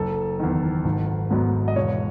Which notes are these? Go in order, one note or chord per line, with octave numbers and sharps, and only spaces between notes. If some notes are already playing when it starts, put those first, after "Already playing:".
Already playing: F#1 A4
E2 D#3
G#1
G#2 F#3 B3
D#5
E1 C#5